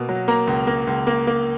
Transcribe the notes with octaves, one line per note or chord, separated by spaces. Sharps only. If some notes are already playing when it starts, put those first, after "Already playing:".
Already playing: B2 A#3
F#3
A#3 A#5
C#2
A#3
C#2
A#3
A#3